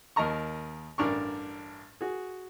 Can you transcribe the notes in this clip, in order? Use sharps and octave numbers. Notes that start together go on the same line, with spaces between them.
D#2 A#4 D#5 A5 A#5 C#6
A1 G2 D4 A#4 C#6
F#4 G#4